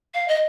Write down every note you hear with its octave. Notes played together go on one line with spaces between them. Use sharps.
F5
D#5